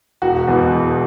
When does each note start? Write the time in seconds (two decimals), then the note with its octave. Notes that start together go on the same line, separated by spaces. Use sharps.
0.22 E1 F#4
0.48 E2 B2
0.73 E1